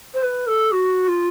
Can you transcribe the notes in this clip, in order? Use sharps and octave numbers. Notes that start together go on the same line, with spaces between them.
C5
B4
A4
F#4
F4